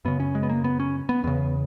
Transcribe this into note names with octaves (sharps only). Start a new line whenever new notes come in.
F#2 C#3 B3
C#4
G#3
B3
A#3
B3
C#4
B3
E2 C#3 B3